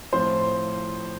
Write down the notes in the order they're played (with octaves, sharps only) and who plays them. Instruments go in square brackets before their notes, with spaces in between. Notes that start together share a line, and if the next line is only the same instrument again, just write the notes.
[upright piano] A2 F3 C4 F4 C5 C6